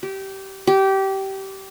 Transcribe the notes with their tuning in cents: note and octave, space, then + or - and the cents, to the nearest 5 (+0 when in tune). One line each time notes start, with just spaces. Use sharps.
G4 -20
G4 -20